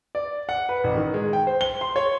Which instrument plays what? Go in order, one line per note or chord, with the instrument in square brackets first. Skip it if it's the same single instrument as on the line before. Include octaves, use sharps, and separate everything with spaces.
[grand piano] D5
F#5
B4
A1
D#3
G#3
G5
C5
G7
C6
C#5